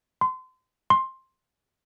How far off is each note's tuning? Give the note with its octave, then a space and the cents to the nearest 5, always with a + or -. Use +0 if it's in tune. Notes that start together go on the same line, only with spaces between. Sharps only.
C6 -30
C6 +10